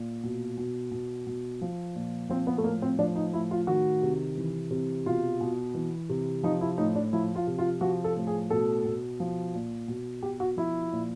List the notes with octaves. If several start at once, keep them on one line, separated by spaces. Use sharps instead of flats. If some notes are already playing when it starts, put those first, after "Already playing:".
Already playing: A#2
B2
B2
B2
B2
F3
A#2
F3 C4
B3
A3
A2 A#3
C4
F3 D4
D#4
A2 E4
F4
D#3 F#4
C3
E3
C3
B2 F4
B2
E3
C3
F3 D#4
E4
A2 D#4
D4
F3 E4
F4
C3
F4
F3 F#4
A4
A2
G#4
B2 A4
B2
F3
A#2
B2
B2 G4
F#4
F3 E4
A#2